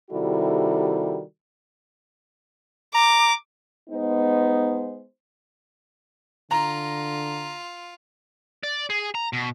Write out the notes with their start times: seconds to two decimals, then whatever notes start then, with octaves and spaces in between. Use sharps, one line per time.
0.11 C3 D#3 G3 E4 F#4 A4
2.95 A#5 D6
3.90 G#3 B3 D#4 C5
6.51 D3 F4 A#5
8.63 D5
8.90 G#4
9.15 A#5
9.33 B2